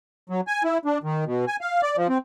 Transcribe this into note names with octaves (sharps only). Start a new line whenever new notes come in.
F#3
G#5
E4
D4
D#3
B2
G#5
F5
D5
F3
C4